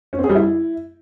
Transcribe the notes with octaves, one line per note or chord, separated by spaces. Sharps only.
C#4
C4
G#4
G3
E4